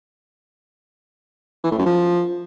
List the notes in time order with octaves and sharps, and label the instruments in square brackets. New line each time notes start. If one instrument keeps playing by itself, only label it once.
[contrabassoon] E3
A2
F#2
F3